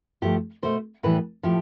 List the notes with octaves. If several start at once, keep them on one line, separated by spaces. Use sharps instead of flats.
G2 F3 A3 G4
B2 A3 C5
A2 E3 G3 B4
A2 F3 A3 G4